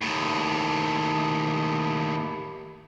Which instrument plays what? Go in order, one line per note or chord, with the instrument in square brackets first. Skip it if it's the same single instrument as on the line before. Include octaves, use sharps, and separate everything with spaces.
[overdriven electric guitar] D#2 A2